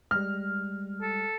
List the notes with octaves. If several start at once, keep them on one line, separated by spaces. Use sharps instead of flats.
G3 G#3 F6
A4